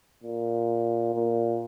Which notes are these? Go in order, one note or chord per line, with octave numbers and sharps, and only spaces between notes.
A#2
A#2